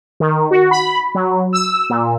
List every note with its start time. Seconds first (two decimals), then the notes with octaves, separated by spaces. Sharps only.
0.20 D#3
0.51 F#4
0.71 B5
1.15 F#3
1.53 E6
1.90 A#2